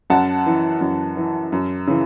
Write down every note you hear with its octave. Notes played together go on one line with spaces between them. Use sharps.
F#2 F#5 A5
E3
F#2
E3
F#2
C#3 E3